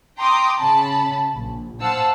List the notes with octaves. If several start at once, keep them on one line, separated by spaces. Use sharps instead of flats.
G5 A#5 C6 D6 D#6
C#3 A5 B5
A#1
C5 F5 F#5 A5 E6